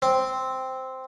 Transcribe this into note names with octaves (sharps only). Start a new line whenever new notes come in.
C4